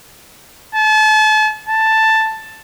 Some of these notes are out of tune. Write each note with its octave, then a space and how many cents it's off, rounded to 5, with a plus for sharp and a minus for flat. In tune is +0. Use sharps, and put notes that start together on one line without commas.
A5 -35
A5 +5